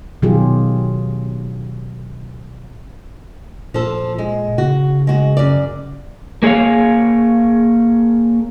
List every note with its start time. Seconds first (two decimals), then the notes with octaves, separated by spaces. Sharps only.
0.22 B2 D#3 F#3 F4 G4 G#4
3.74 A#2 F3 A4
4.18 G#3
4.58 C#3 F#4
5.07 G#3 F#4
5.37 F#2 D5
6.43 A#3 G#4 A4 C#5 F5